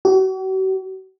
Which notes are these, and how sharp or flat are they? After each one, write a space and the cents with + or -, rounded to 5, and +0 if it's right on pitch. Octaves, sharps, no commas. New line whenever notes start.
F#4 +45